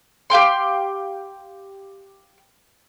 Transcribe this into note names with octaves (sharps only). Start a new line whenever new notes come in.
G4 F5 G5 C6